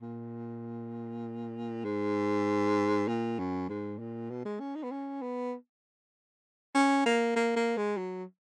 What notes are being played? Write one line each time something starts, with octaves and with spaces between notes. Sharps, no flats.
A#2
G#2
A#2
F#2
G#2
A#2
B2
G#3
C#4
D#4
B3
C#4
B3
C#4
A#3
A#3
A#3
G#3
F#3